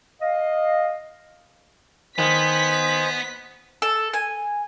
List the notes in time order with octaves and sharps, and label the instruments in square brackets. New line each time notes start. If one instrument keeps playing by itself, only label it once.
[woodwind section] D#5 F5
[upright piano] D#3 [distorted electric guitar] B3 [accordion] C5 D#5 G#5 [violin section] B6
[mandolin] A4
G#5